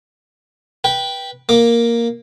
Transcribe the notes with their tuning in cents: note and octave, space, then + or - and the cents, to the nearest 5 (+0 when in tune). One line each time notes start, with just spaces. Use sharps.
B4 -15 G5 +0
A#3 +0 D6 +0